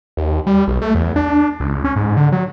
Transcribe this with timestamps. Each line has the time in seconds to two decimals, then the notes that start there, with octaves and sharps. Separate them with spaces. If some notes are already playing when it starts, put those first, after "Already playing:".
0.17 D#2
0.47 G3
0.68 B1
0.82 A3
0.95 E2
1.16 D4
1.60 C#2
1.84 C#4
1.96 G#2
2.17 D3
2.32 F#3